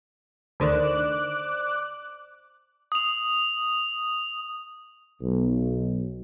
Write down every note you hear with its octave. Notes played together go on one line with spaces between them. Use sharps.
D2 D3 D#3 C5 D5 D6 F#6 E7
D#6 F7
B1